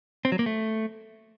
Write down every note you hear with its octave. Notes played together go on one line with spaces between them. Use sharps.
C4
F#3
A#3
A3